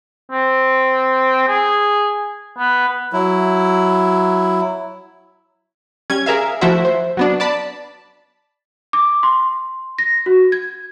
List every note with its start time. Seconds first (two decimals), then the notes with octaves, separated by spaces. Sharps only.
0.32 C4
1.48 G#4
2.58 B3
3.13 F#3 E4
6.10 G3 C#4 G#6
6.26 G#4 A#4 E5 F5
6.61 F3 A3 E4 F#4 C5 E5
6.85 C5
7.17 F#3 B3 D4
7.40 D5 A5 B5
8.93 D6
9.23 C6
9.98 A#6
10.26 F#4
10.52 G#6